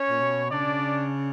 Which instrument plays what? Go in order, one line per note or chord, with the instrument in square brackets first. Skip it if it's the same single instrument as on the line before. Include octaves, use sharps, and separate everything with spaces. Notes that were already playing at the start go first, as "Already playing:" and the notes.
Already playing: [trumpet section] C#4 C#5
[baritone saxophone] A#2
B2
[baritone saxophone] C#3 [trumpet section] D4 D5